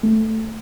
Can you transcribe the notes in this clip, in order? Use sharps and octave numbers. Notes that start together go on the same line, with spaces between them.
A3